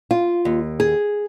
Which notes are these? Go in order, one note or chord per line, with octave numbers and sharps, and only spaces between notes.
F4
D#2
G#4